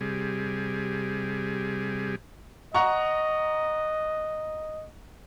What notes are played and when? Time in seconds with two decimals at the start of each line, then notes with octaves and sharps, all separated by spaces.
0.01 C3 G3 G#4
2.75 D#5 F#5 A#5 C#6